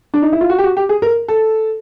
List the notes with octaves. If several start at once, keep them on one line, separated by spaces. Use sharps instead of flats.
D4
D#4
E4
F4
F#4
G4
F#4
G4
G#4
A#4
A4